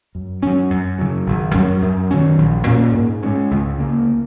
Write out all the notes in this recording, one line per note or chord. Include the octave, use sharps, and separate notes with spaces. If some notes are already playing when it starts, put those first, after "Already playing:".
F#2
F#3 C#4
F#2
C#3 F#3
G#1
F#2 F#3 C#4
F#2
D#3 F#3 C#4
A#1
A#2 A#3 C#4
G#2
G#3 C#4
C#2
C#3 A#3